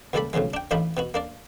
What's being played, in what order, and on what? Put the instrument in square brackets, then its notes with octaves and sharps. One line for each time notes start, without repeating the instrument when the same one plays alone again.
[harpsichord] C#2 A#2 G3 A4 D5 B5
B1 A2 C#3 F3 G#3
D4 G5
A1 A2 D4 D#4 F4 B5
B2 B3 F#4
A#3 D4 D5